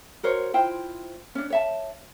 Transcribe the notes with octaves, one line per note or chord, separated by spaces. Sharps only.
F#4 A#4 C5 C#5
E4 F4 C5 G5
C#4 D4
C#5 E5 A5